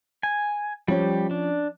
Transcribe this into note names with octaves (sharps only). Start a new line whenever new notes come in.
G#5
F3 G3 C#4 G4 C#5
D4